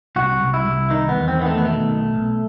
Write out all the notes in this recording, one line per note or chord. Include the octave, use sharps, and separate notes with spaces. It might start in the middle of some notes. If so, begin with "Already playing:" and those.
C2 F#4
C2
E4
C2
D#3 D#4
B3
E2
C4
D#3 B3
A3
B3
B2 A3
B1
B1